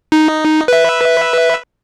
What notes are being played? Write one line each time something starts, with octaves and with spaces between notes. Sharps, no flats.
D#4
B4 E5